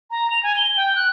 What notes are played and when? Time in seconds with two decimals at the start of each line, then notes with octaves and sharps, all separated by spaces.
0.11 A#5
0.30 F7
0.43 G#5
0.57 G7
0.77 G5
0.96 F#6